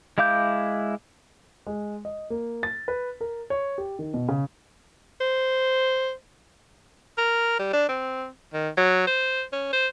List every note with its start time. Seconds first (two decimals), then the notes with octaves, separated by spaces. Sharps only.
0.18 G#3 E4 F5 D6 G6
1.67 G#3
2.05 D#5
2.30 A#3
2.63 A6
2.88 B4
3.21 A#4
3.50 C#5
3.78 G4
3.99 D#3
4.14 B2
4.28 C#3
5.21 C5
7.18 A#4
7.59 G3
7.73 D4
7.89 C4
8.53 D#3
8.77 F#3
9.07 C5
9.52 C#4
9.73 C5